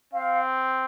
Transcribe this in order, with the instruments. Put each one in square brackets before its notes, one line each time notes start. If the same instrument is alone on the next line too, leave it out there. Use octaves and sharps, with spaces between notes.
[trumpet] C4 [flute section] F5